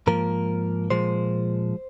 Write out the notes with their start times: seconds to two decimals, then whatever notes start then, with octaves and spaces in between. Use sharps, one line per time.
0.07 G#2 F3 A#3 A#4
0.90 A#2 F3 G#3 C5